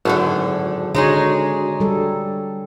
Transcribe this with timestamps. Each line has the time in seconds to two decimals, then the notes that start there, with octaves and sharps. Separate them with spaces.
0.05 G#1 F#2 A2 D3 A5
0.95 D3 G#3 D4 D#4 F#4 G#4 C#5 A#5
1.80 G3 A4